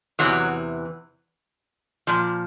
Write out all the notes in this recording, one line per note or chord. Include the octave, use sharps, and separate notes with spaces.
E2 C3 E3 F#3
A#2 F3